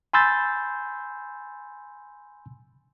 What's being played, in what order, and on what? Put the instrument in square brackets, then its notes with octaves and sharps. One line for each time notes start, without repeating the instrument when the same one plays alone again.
[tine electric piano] G#5 B5 C6 E6 G6 A6